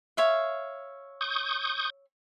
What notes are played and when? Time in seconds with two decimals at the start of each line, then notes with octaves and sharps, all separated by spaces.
0.17 C#5 E5 F5
1.21 C#6 D#6 G6